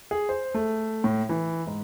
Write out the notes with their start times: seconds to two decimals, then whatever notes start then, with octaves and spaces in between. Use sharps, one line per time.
0.11 G#4
0.29 C5
0.54 A3
1.04 A2
1.29 E3
1.67 G#2